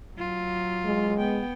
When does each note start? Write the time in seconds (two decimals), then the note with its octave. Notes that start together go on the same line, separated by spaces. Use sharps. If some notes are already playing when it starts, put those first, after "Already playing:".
0.15 F#3 F4
0.85 G#3
1.19 B3 G5